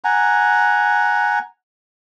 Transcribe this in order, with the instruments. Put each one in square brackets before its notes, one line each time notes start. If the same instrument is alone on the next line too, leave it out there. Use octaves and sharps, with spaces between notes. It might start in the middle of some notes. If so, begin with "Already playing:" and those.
[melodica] F#5 G#5 A#5